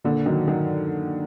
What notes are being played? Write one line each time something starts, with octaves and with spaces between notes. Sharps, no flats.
A#2 D3
D#3 F#3
D#3 F#3